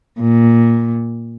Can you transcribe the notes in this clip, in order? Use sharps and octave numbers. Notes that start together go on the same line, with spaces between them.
A#2